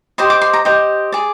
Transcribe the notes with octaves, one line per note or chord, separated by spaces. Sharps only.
G4 C5 D#5 C6
D6
C6
A#5
G4 C5 D#5
G#4 D5